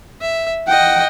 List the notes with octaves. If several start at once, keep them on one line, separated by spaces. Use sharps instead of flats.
E5
D#5 F#5 G5